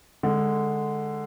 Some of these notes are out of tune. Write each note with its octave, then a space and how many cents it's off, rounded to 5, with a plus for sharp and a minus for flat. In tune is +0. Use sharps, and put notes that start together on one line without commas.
D3 +10 G#3 +0